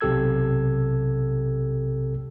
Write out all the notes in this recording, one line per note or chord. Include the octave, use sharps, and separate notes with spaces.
B1 C3 G4 A4 E6 G#6